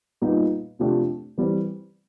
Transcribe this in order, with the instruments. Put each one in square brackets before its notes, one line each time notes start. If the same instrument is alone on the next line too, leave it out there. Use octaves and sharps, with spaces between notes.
[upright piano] A#2 G3 B3 D#4 G4
C3 F3 A3 D4 G4
E3 G3 C4